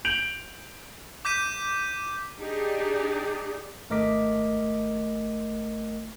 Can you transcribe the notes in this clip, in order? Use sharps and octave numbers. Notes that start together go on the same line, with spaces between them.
G6 D7 F7 F#7
D6 G6 B6 D#7
D4 D#4 G4 G#4 D5
G#1 A3 A#4 D#5 D6 B6